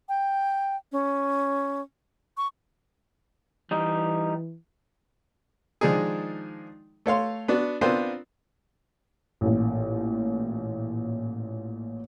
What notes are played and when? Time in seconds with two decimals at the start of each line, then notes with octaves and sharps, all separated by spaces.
0.09 G5
0.92 C#4
2.37 C#6
3.71 E3 G3 D#4
5.81 D#3 F3 G#3 D4 D#4 G#4
7.06 A3 C#5 F5 C6
7.48 B3 D4 F#4
7.81 B3 C4 D4 F4 A#4 C5
9.41 A1 A#2